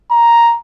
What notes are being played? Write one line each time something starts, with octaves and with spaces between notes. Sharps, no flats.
A#5